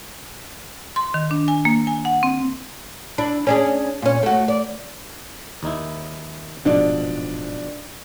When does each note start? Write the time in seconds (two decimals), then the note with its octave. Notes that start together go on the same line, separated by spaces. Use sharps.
0.96 C6
1.14 D#3
1.31 D4
1.48 G#5
1.65 A#3
1.87 G#5
2.05 F#5
2.23 C4
3.18 D4 E4
3.47 C#4 D4 G#4
4.02 A#2 C#4
4.23 A3 F#4
4.48 D5
5.63 D#2 D#4 E4
6.65 D1 G#2 B2 F3 D4 D5